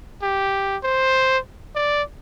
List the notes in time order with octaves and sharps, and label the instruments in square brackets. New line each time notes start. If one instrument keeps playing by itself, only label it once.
[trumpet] G4
C5
D5